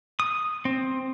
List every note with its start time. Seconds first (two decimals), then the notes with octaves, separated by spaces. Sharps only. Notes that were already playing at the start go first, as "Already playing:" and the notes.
0.20 D#6
0.65 C4